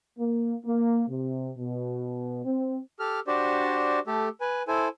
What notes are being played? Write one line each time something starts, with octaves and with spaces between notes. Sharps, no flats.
A#3
A#3
C3
B2
C4
G4 A4 F6
D4 F#4 G4 C5 D5
A3 G4 A4
B4 G#5
E4 A4 C5 G#5